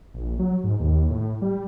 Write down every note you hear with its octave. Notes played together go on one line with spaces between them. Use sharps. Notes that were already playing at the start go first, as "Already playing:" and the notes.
A#1
F#3
G#2
D#2
A2
G3